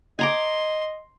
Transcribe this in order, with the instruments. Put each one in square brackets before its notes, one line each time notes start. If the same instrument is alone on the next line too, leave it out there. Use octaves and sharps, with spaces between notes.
[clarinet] D#5 [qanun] G#5 A#5 D6 [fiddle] C6